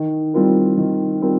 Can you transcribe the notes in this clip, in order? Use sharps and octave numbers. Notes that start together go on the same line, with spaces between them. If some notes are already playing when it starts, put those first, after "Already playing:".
Already playing: D#3
G3 C4 F4 A#4
D#3
G3 C4 F4 A#4